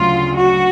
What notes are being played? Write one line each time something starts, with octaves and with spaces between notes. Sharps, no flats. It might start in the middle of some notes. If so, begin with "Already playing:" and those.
Already playing: D2 C#3 F#3 F4
F#4